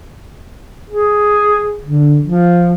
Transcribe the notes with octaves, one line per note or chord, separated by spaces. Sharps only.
G#4
D3
F3